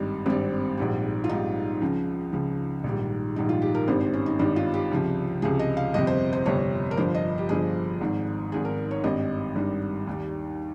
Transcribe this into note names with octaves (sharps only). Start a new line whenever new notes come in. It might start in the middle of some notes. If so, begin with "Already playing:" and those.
Already playing: G#1 G2 G3 D#4
G#1 G2 G3 C4
A#1 G#2 G3
F4
A#1 G#2 G3 D#4
C#2 C#3 F3
C#2 C#3 F3
A#1 G#2 D#3 G3
A#1 G#2 D#3 G3 D#4
F4
G4
A#4
G#1 G2 D#3 G3 C5
C5
C#4
D#4
G#1 G2 D#3 G3 D#4
F4
G4
C#2 C3 F3
C#2 C3 F3 G#4
D#5
F5
G1 F2 C3 D#5
C5
C5
G1 F2 C3 C#5
A#4
G1 G2 F3 C5
D#5
G4
G1 G2 F3 G#4
G#1 G#2 D#3
G#1 G#2 D#3 G#4
A#4
C#5
G#1 G2 D#3 G3 D#5
G#1 G2 D#3 G3
D#2 D#3 G3